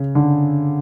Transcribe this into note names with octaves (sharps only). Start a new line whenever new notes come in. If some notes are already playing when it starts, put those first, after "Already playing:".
Already playing: C#3
D3